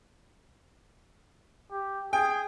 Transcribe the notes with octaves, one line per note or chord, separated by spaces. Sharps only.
G4
G#4 G5